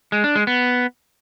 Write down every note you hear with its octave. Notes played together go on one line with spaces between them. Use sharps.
G#3
D4
G#3
B3